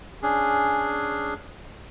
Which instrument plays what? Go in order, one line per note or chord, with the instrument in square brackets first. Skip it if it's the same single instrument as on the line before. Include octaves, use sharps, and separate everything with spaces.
[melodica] C#4 D4 G#4